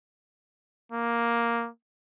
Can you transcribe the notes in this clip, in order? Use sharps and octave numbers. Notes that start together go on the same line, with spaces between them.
A#3